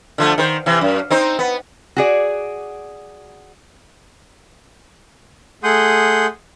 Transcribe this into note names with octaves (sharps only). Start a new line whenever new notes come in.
D3 F3 A3
D#3 C5
C3 E3
F#2
C4 D#4 C5
B3
F#4 G#4 D5
A3 G#4 F#5 C6 D#6 G6